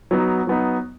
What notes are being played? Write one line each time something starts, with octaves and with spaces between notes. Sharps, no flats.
F#3 B3 D#4
F#3 B3 D#4